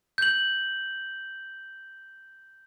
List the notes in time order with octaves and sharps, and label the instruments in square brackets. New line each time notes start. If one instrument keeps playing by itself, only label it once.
[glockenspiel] G6 F#7